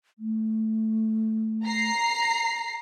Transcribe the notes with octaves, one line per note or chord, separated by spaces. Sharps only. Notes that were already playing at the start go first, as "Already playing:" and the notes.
A3
A#5 C7